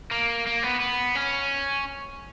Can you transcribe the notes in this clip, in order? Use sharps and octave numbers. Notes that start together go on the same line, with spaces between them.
A#3
A#3
B3
B3
C#4